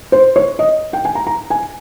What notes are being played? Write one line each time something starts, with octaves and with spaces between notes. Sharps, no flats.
C5
C#5
D#5
G5
G#5
A#5
A#5
G#5